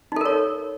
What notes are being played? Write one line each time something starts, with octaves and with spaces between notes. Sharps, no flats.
D#4 A4 A#4 C#5